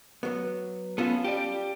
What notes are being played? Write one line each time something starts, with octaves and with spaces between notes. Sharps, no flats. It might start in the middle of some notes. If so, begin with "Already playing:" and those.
F#3 B3
B3 C#4 F4 A4
G4 D5